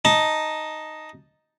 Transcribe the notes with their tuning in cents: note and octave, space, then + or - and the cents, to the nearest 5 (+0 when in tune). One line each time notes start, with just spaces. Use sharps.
D#4 +0 A5 +0